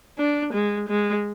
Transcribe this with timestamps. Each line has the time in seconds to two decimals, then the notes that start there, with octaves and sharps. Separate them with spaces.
0.18 D4
0.53 G#3
0.89 G#3